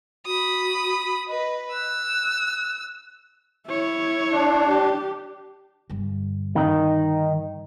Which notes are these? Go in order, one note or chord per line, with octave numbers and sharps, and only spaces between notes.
F#4 B5 D#6
B4 D#5
E6 F#6
E4 C#5
D4
G4
G2 D3
D#3 D#4